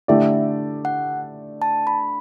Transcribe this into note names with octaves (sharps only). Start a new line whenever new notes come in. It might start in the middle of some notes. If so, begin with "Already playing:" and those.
D3 A3 E4 G4 D5 E5
F#5
A5
B5